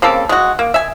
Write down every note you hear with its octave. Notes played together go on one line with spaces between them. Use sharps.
C#3 A#3 C4 A4
G#3 F#4
A#3
E5 G#5